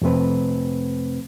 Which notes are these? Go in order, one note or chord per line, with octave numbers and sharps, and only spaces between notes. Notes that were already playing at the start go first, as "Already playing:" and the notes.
F2 C3 A3 C4 B4